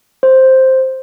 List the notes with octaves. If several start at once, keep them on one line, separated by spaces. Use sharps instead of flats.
C5